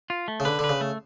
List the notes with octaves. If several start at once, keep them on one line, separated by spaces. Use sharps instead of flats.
F4
A3
C#3
D3 B4
D3 B4
C#3
A3